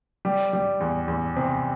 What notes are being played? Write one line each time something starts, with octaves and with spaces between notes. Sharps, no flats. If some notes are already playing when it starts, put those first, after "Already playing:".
G3
G3
E2
E2
C3